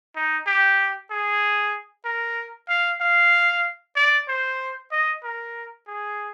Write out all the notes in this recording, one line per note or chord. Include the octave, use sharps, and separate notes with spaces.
D#4
G4
G#4
A#4
F5
F5
D5
C5
D#5
A#4
G#4